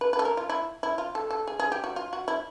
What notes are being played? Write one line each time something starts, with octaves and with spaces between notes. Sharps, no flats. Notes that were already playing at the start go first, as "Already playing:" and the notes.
B4
B4
A4
A#4
F4
E4
E4
F4
A4
A4
G#4
G#4
G4
F#4
F4
F#4
E4